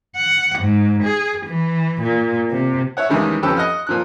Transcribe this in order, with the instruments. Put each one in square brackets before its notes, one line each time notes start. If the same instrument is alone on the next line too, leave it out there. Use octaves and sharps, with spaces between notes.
[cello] F#5
G#2
G#4
E3
A#2
C3
[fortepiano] E4 C#5 F#5
D#2 D#3 E3 G3 G#3 C#4
F2 C#4 G4 A4 B4 E6
D#5 F#5 F6
A#2 F3 F#6